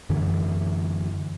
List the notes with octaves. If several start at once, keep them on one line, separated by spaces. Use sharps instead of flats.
F#2 D3 E3